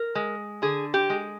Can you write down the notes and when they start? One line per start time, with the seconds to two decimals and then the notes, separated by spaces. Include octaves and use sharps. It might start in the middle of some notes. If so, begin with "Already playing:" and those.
Already playing: A#4
0.15 G#3
0.62 D3 G#4
0.94 G4
1.10 G#3